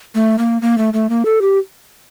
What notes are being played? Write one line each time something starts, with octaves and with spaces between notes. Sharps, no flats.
A3
A#3
A#3
A3
A3
A#3
A4
G4